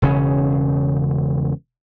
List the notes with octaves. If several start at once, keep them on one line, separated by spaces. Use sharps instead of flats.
E1 C#3 C#4